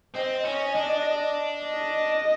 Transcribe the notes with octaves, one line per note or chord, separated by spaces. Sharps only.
C4 D#5
C#4 D#5
D4
D#5